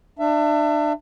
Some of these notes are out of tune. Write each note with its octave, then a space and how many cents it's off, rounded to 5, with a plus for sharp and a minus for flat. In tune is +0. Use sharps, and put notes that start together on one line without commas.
D4 +30 E5 +25